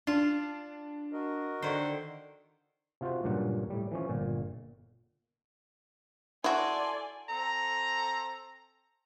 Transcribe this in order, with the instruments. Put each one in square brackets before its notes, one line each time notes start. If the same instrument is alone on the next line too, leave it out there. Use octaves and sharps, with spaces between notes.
[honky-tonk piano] D4 [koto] F4
[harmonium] F#4 A#4 D#5
[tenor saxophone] D3 [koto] D#3 C5
[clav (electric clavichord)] C3 F4 F#4 C5
C#2 G2 A#2 F#3 F#5
A2 G3
E3 F3 C#4
G1 A#2
[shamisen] E4 F#4 [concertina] A4 C6 [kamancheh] D5 G#5
[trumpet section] C4 A4 A#5